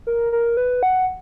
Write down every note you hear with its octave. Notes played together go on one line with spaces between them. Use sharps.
A#4
A#4
B4
F#5